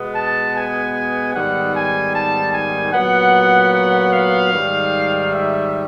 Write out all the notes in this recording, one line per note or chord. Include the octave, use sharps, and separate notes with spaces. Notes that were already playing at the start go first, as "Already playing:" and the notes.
Already playing: B2 G#3 B3
A5
G#5
G#2 D#3 G3 B3 F#5
G#5
A5
G#5
A#2 F#3 B3 F#5
F#5
F5
G#2 D#3 G3
E5